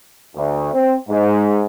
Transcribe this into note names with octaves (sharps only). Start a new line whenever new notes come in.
D2
C4
G#2